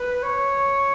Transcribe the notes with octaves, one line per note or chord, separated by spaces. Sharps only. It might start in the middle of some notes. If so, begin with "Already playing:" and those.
Already playing: B4
C#5